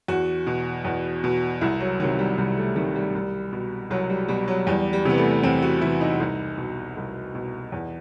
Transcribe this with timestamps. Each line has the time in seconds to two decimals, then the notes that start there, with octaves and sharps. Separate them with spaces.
0.08 E2 F#4
0.47 B2
0.85 E2
1.24 B2
1.61 C2 E4
1.80 F#3
2.00 C3 D#3 F#3
2.19 G3
2.38 C2 G3
2.57 A3
2.76 C3 D#3 G3
2.95 G3
3.14 C2
3.52 B2
3.90 C2 F#3
4.10 G3
4.28 B2 G3
4.48 F#3
4.67 E2 G3
4.93 G3
5.05 C3 E3 B3
5.18 A3
5.43 E2 C4
5.62 F#4
5.81 C3 E3 E4
6.01 D#4
6.20 C2 D#4
6.58 B2
6.97 C2
7.35 B2
7.72 E2